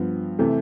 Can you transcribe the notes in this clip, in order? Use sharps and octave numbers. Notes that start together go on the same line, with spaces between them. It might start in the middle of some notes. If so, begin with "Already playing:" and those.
Already playing: G2 F3 B3
C3 E3 A3